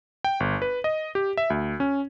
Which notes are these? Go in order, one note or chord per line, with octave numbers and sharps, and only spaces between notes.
G5
G1
B4
D#5
G4
E5
D2
C#4